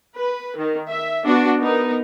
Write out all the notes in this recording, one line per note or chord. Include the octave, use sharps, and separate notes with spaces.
B4
D#3
E5
B3 D4 F#4
B3 D#4 A#4